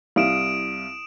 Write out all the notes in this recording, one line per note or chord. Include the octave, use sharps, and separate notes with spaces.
C2 E4 F5 D#6 D7 E7